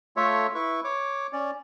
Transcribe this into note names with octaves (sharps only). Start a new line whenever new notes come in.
A3 F4 A4 C#5 E5
E4 B4 C#6
C#5 D6
C#4 D5